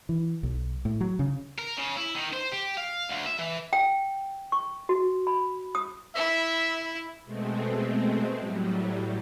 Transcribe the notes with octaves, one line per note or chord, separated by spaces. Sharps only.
E3
B1
A2
F#3
C#3
A#4
C#3
E4
D#3
C5
G4
F5
D2
E5
E3
G5
C#6
F#4
B5
D#6
E4 E5
B2 G#3 A3 C4
A2 F#3 G3